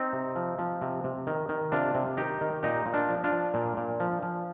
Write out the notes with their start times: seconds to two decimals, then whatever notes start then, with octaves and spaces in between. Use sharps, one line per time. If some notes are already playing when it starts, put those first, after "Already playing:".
Already playing: C4 D#4
0.13 C3
0.36 F3
0.59 F3
0.82 C3
1.04 C3
1.27 D#3
1.49 D#3
1.72 C3 D4 F4
1.95 C3
2.17 D#3 D#4 G4
2.41 D#3
2.63 A#2 D#4 G4
2.86 A#2
2.94 D4 F4
3.09 F3
3.24 D4 F4
3.31 F3
3.54 A#2
3.77 A#2
4.00 F3
4.23 F3